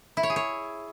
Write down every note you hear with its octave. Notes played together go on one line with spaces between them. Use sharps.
E4
C#5
G#4
C#5